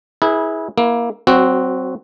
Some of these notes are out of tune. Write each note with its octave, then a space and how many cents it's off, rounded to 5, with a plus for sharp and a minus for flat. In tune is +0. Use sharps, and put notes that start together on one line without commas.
E4 -25 G#4 +0 B4 -30
A#3 +15 E4 +0
F#3 +30 C4 -5 F#4 +0